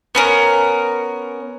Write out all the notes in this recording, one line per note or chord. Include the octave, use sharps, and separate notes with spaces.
B3 C#4 A#4